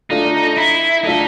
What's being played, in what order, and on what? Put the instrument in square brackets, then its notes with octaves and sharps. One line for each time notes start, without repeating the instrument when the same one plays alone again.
[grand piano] A3 D4 F4 A4 [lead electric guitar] D#4
[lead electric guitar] E4
[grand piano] A3 D4 F4 A4 [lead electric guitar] D#4